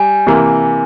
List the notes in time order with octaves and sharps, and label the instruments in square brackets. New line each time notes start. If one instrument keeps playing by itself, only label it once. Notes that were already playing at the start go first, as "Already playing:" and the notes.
Already playing: [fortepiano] G3 [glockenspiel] G#5
[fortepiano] C3 E3 A#3